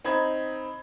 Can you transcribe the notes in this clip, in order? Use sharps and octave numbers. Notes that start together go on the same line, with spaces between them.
C4 D#4 B5 G#6